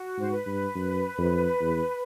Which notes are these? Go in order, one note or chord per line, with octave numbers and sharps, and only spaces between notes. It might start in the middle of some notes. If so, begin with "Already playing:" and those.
Already playing: F#4
G#2 C5
B4
G2
F#2
F2
E2